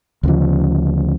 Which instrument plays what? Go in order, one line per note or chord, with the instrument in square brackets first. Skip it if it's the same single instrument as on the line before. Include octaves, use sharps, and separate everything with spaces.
[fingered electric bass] D2 C#3 F3